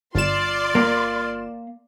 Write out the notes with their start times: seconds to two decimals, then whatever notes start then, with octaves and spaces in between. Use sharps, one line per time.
0.15 G1 F4 D5 C6 E7
0.75 A#3